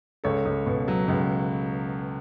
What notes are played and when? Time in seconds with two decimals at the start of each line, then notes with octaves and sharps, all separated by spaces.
0.24 C#2 A4 C#5
0.45 C#2
0.66 B2
0.88 F#3
1.08 C#2